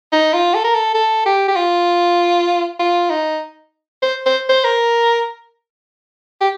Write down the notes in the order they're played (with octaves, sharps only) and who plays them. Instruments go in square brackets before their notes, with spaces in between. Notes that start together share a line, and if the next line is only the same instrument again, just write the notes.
[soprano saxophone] D#4
F4
A4
A#4
A4
A4
G4
G4
F4
F4
D#4
C5
C5
C5
A#4
G4